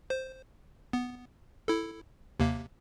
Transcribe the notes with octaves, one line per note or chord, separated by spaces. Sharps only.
C5
B3
E4 A4
D#2 C3 A#3